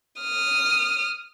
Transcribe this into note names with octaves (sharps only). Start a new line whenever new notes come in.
D#6 F6